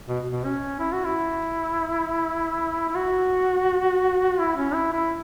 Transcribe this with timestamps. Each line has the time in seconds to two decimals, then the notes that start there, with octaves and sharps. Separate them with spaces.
0.08 B2
0.31 B2
0.44 C#4
0.80 E4
0.92 F#4
1.05 E4
2.89 E4
2.95 F#4
4.39 E4
4.57 C#4
4.74 E4
4.93 E4